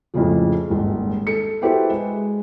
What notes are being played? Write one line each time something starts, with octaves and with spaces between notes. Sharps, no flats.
F2 A2 C#3 F3
D#1 G#1
A4 C#7
E4 F#4 G4 A4 B4 C5
G#3